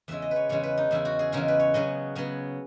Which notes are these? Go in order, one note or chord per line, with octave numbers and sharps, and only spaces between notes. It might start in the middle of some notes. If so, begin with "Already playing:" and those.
E2 C#3 G#3 E5
D#5
B4 C#5
E2 C#3 G#3 C#5
B4
D#4
E2 C#3 G#3 E4
F#4
G#4
E2 C#3 G#3 A#4
B4
C#5
C#3 F#3 B3 D#5
C#3 F#3 B3